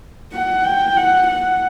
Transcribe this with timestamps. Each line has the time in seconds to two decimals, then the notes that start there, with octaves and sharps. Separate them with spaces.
0.33 F#5
0.64 G5
0.97 F#5
1.27 F#5